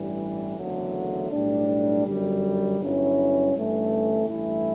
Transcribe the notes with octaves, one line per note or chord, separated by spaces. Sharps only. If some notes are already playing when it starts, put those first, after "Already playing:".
Already playing: A1 G2 E3 G3
F#1 E2 D3 F#3 A3
B1 A2 G3 D4
G1 F#2 D3 G3
G1 G2 F#3 C#4 E4
G1 G2 E3 A3 C#4
A1 G2 E3 A3 E4